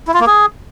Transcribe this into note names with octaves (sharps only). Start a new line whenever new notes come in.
E4
F4
A#3
G#4